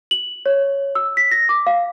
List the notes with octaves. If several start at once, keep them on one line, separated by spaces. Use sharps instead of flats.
F#7
C#5
E6
B6
A#6
D6
F5